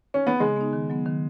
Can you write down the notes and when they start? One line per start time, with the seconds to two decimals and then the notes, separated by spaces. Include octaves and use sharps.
0.14 C#4
0.27 B3
0.40 C#3 G#3
0.56 B3 D#4
0.73 D#3
0.90 F#3 B3
1.06 D#3